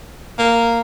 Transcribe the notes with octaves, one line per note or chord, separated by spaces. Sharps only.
A#3